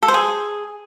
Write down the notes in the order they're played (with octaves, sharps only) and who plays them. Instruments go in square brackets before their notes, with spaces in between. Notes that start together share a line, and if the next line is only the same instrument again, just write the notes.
[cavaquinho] A4
C5
G#4